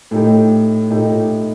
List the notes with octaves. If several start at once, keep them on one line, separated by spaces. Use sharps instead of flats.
A2 A3 D#4 G4
A2 A3 D#4 G4